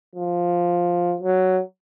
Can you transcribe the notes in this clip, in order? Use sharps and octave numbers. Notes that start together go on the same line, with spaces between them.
F3
F#3